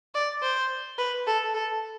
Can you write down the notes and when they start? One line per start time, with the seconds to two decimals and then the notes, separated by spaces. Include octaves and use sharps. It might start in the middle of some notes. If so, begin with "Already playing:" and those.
0.14 D5
0.42 C5
0.98 B4
1.27 A4
1.54 A4